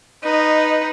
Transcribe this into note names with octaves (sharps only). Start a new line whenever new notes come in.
D#4 B4 D#5